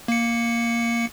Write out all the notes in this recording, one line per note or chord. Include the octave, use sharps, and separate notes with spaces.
A#3 C#7